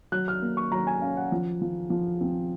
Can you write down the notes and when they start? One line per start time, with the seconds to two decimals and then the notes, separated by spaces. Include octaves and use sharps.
0.12 F#3 F#6
0.28 F6
0.42 A#3
0.57 C#6
0.72 F#3 A#5
0.87 G#5
1.02 C#4 F5
1.17 F#5
1.32 F3
1.61 F3
1.90 F3
2.21 C4